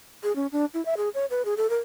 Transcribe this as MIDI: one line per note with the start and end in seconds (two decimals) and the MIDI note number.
0.23 0.34 68
0.36 0.47 61
0.52 0.65 62
0.74 0.84 64
0.86 0.95 76
0.97 1.09 68
1.14 1.26 73
1.30 1.42 71
1.45 1.55 68
1.57 1.70 69
1.70 1.78 70